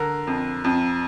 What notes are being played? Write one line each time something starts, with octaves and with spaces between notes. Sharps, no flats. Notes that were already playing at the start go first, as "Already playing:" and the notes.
Already playing: D3 A#4
F2
F2